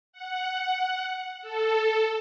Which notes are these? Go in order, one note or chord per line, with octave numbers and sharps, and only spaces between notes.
F#5
A4